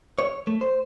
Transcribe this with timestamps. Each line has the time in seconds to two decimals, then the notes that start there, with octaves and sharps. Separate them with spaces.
0.19 C#5
0.47 A3
0.61 C5